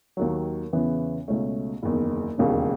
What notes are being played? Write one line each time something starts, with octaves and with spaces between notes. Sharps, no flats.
D#2 D#3 F#3
E2 C#3 E3 B3
C#2 B2 A3 C#4
F#1 E2 D#3
E1 D#2 C#3